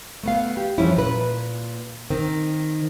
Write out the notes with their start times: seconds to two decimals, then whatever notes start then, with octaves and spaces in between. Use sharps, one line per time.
0.23 A3 B3 F5
0.57 G4
0.78 F2 E3 F3 G3 C#4 E4
0.96 A#2 B4
2.10 D#3 C4